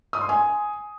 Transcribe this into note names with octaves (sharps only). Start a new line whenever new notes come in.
D#6
C6
G#5